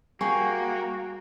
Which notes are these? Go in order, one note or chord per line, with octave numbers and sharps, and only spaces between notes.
G3 A#3 F#4 G#4 C#5 G5